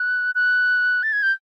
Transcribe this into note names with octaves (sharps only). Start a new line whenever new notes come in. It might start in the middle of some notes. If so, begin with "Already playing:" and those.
Already playing: F#6
F#6
A6
G#6
G6